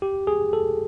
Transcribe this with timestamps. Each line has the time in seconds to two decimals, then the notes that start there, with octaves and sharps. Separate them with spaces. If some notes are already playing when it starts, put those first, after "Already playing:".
0.02 G4
0.27 G#4
0.53 A4